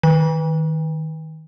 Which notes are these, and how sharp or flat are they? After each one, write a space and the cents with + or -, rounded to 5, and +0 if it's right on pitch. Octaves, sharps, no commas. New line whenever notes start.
D#3 +15 B5 -45